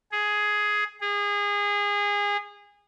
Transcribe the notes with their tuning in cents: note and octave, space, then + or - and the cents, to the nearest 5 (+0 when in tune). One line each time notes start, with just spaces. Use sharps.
G#4 +10
G#4 -25